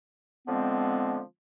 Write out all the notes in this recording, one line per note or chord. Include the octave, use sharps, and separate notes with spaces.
D3 F3 G#3 B3 C4